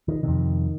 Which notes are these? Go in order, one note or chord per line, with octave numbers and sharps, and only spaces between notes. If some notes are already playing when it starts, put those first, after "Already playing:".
D#3
F2 C3 D#3